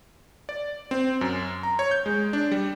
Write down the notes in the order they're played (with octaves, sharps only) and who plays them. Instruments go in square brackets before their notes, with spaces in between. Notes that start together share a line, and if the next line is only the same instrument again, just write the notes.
[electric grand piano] D5
C4
F#2
A#5
C#5
G6
G#3
D4
G3